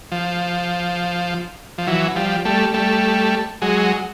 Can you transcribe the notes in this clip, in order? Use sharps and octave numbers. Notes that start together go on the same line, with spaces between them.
F3
F3
E3 F#3
F3 G3
G3 A3
G3 A3
F#3 G#3